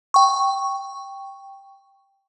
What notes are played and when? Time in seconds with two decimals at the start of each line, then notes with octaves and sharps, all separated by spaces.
0.14 G5 C#6